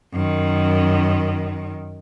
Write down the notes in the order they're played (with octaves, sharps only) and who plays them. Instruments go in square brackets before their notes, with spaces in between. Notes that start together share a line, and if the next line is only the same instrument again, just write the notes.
[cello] F#2 D#3